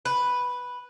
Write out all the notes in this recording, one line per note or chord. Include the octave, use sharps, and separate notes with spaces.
B4